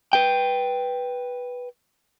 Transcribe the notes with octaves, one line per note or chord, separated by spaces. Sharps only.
B4 G5